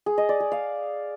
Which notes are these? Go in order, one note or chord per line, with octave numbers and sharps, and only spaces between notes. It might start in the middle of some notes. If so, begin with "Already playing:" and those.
G#4
D#5
D5
G#4
F5